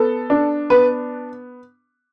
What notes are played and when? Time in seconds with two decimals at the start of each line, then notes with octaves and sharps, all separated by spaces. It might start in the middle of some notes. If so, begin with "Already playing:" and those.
Already playing: B3 A4
0.30 D4
0.70 B3 B4